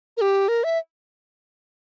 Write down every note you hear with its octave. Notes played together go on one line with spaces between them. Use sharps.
A#4
G4
A#4
E5